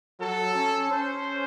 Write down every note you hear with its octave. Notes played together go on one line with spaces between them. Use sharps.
F#3 A4
C#4
C#4 C5